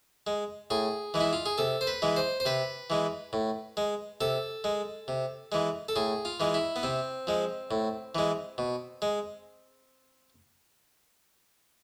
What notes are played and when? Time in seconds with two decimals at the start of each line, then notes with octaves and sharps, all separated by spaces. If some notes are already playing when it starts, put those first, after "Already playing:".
0.27 G#3
0.70 A2 G#4
1.14 E3 G#3
1.20 E4
1.33 F4
1.46 G#4
1.58 C3 A4
1.81 C5
1.87 B4
2.02 E3 G#3
2.16 C5
2.40 C5
2.45 C3 B4
2.90 E3 G#3
3.33 A2
3.77 G#3
4.21 C3 A4
4.64 G#3
5.08 C3
5.52 E3 G#3
5.89 A4
5.96 A2 G#4
6.25 F4
6.40 E3 G#3
6.54 E4
6.76 B3
6.83 C3 C4
7.27 F3 G#3
7.71 A2
8.15 E3 G#3
8.58 B2
9.02 G#3